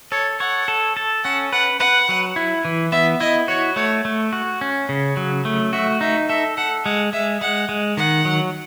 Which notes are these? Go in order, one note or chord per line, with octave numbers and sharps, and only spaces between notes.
A4 C#5
C#5 F#5
A4
A4
C#4 F#5
B4 F#5
B4 F#5
F#3
E4
E3
B3 E5
E4 D#5
F#4 C#5
A3 C#5
A3
F#4
C#4
C#3
F#3
A3
F#4 E5
D#4 E5
A4 E5
A4 F#5
G#3 F#5
G#3 E5
G#3 F#5
G#3
D#3 F#5
F#3